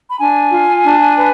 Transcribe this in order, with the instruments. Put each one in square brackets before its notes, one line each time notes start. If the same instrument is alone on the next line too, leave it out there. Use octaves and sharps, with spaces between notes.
[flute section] B5
D4 G#5
F4
D4
B4